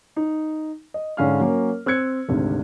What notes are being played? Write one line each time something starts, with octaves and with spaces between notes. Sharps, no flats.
D#4
D#5
G#2 D3 C#4 F5 F6
F#3 A#3 C#4 A#4
C4 E6 F#6 G#6 C#7
G#1 D2 C3